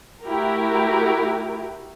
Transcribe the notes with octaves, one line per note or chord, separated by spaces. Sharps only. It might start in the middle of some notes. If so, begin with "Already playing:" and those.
A3 E4 F#4 G4 A#4